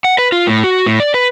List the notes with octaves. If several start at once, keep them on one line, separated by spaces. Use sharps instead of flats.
F#5
B4
F4
A2
F#4
A2
D5
B4